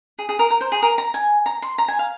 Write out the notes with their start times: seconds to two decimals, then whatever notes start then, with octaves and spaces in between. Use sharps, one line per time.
0.19 G#4
0.29 G#4
0.39 A#4
0.50 A#4
0.61 C5
0.72 G#4
0.83 A#4
0.98 A#5
1.14 G#5
1.46 A#5
1.62 C6
1.78 A#5
1.88 G#5
1.99 F5